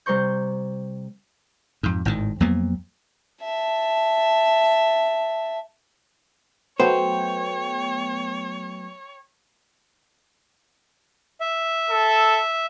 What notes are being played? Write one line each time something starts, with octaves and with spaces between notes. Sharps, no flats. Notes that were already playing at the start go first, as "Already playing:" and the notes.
C3 G3 A#4 C5 C#6 G6
F2 G#2
G#1 A2 C3 D#3
F2 F#3 A#3 B3
E5 A5
F#3 A3 B3 C5 C#5 G5
E5
A4